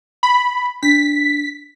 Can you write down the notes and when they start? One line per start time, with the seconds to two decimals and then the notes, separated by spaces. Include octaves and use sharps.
0.23 B5
0.83 D4 B6